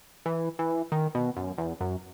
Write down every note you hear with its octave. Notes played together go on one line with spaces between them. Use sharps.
E3
E3
D#3
B2
F#2
E2
F#2